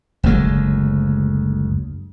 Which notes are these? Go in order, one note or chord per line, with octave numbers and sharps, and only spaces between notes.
F#1 D2 F#3 G#3